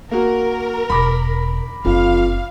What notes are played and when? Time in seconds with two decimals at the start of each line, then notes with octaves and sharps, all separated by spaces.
0.11 A#3 F#4 A#4
0.90 E1 B5 D6 A#6
1.85 F#1 F2 D#4 F5